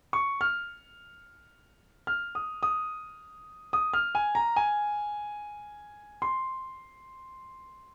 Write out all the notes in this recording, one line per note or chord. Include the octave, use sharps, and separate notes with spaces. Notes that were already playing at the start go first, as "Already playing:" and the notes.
C#6
F6
F6
D#6
D#6
D#6
F6
G#5
A#5
G#5
C6